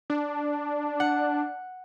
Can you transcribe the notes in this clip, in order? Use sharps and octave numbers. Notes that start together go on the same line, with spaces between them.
D4
F#5